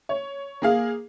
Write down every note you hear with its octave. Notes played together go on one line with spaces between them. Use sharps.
C#5
A#3 G#4 F5